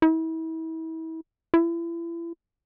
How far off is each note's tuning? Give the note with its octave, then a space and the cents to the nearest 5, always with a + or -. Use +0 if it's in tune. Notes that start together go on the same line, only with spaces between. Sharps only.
E4 -35
E4 +35